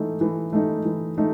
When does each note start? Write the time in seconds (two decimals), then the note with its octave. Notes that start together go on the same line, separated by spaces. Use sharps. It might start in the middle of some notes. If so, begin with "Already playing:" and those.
Already playing: E3 A3 D#4
0.21 E3
0.53 A3 D#4
0.85 E3
1.18 A3 D#4